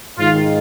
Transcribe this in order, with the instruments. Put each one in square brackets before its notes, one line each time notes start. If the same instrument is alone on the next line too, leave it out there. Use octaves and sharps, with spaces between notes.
[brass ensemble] G#2 D#3 F4